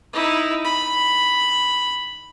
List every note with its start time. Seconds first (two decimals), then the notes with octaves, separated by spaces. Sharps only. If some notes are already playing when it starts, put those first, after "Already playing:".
0.13 D#4 E4
0.64 B5